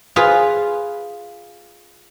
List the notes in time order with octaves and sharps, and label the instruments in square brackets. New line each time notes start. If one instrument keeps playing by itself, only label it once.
[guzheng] F4 G#4 B4